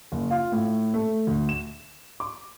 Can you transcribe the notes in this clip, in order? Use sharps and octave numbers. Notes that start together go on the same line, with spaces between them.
F#1
F4
A2
A3
D2
E7
D6